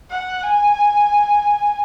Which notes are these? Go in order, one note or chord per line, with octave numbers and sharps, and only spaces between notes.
F#5
G#5